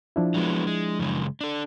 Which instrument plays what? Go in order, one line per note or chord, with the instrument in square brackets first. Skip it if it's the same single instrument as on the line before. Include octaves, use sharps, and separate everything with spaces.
[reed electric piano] F3 D4 E4
[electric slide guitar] F#3 G#3 B3
G#3
F#2 C#3 G#3
D4 A4